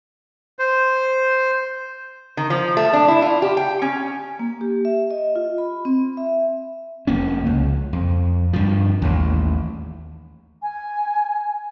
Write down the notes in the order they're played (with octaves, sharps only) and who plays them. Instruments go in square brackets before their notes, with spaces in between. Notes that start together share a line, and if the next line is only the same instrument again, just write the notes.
[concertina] C5
[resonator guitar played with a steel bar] D#3
F3
A3
D4
E4
F4
G4
G5
C#4
[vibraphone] A#3
G4
E5
D#5
F4
B5
C4
E5
[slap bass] F1 A#3 C#4
C#2
F2
G2 F3
A1 D#2
[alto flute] G#5